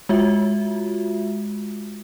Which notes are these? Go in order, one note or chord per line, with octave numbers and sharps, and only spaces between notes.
G#3 F4 F#4 E5